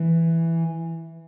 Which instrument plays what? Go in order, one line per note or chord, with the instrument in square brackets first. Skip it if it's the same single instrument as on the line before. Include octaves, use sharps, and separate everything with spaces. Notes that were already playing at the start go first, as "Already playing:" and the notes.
Already playing: [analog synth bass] E3